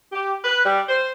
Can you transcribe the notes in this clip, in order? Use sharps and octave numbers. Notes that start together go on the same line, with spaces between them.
G4
B4
G3
C5